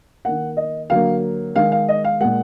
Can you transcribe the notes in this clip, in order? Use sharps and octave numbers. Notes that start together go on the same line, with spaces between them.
D#3 A#3 F#5
D#5
D3 F#3 A#3 F5
D#3 G#3 F5
F5
D#5
F5
A#2 G#3 F#5